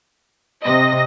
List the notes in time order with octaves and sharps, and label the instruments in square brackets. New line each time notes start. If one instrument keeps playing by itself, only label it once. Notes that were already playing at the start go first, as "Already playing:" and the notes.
[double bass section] C3 [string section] D#5 A#6